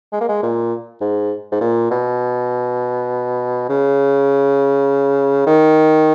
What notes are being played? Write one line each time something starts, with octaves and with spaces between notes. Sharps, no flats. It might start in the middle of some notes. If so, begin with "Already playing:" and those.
G#3
A#3
G#3
A#2
G#2
G#2
A#2
B2
C#3
D#3